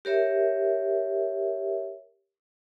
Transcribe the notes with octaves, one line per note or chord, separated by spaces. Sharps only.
G4 A#4 C#5 E5